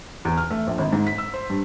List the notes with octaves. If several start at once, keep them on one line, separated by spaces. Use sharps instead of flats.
E2
F6
A3
A#1
G#1
G#2
B6
E6
C5
G2